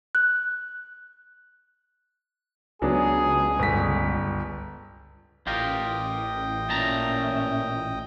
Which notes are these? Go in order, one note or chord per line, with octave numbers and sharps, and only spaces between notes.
F#6
C#2 F#3 B3 D4 G#4
G1 B6
A1 F4 G4 A#4 D#5 G5
A#2 C#4 E5 A5 A#5